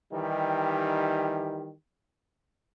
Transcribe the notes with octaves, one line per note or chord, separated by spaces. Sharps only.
D#3 E3 G3 D#4 G4